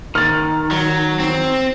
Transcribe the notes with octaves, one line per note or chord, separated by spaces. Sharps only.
D#3 F6 A6
F#3
C4